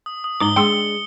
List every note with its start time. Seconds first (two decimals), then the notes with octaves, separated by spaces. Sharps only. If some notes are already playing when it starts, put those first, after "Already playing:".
0.06 D#6
0.24 D#6
0.40 G#2 D#4 D6 D#6 G7
0.56 G#3 D4 G5 C6 E6 C#7 G7